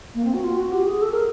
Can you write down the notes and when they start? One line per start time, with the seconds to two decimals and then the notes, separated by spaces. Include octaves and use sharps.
0.15 A#3
0.25 C4
0.34 F#4
0.44 F4
0.57 F#4
0.72 G4
0.86 G#4
1.01 A4
1.11 A#4